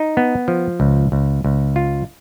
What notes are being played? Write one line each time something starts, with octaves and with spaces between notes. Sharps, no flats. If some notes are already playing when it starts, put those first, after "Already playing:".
Already playing: D#4
B3
F3
C#2
C#2
C#2
F4